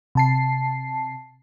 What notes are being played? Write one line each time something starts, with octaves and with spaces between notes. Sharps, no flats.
C3 A5 C7